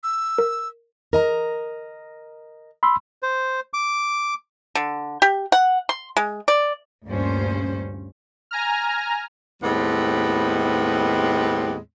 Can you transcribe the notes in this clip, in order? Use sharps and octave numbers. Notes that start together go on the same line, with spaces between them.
E6
A#4
A#4 D#5 A#5
B5 C6 E6
C5
D6
D3
G4
F#5
C6
G#3
D5
D2 G2 A#2 C#4 C5
G#5 A#5 F6
D#2 A2 G3 G#3 B3 C4